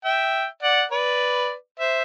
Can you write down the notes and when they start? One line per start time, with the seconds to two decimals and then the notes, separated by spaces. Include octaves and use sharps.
0.04 E5 G5
0.63 D5 F#5
0.91 B4 D5
1.80 C5 E5